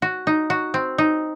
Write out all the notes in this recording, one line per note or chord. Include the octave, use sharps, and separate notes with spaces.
F#4
D#4
F#4
C4
D#4